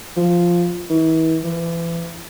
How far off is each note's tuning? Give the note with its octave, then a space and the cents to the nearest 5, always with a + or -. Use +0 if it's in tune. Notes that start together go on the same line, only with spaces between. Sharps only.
F3 -5
E3 -40
E3 +30